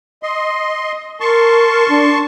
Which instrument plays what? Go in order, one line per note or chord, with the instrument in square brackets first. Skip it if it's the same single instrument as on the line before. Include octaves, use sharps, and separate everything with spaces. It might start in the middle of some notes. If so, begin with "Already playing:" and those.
[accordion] D#5 C6
[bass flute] A#4 [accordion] A5 C6 C#6
[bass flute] D4